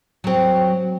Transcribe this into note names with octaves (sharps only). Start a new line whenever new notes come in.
F#3 C4